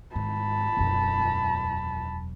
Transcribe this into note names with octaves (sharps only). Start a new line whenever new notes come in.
G#2 D#3 A5 B5
E1 F#2